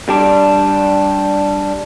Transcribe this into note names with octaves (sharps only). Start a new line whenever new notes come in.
G3 D4